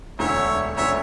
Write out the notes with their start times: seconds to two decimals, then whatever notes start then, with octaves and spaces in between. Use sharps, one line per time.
0.19 E1 D2 D3 C#5 E5
0.77 E1 D2 D3 C#5 E5